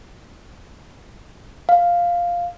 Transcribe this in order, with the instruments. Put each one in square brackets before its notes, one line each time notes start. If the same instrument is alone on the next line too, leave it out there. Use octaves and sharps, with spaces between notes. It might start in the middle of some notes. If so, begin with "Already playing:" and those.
[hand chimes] F5